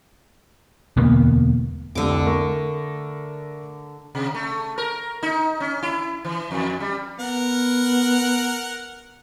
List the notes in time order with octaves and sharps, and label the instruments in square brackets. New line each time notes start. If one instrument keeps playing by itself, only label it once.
[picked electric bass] E1 D2 A#3 B3
[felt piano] F1 C2 [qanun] D3 D6
[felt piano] A3 A#4 C#6
[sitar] C3
A3
A#4
D#4
C#4
E4
E3
F2
G3
[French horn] B3 [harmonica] A#4 F#5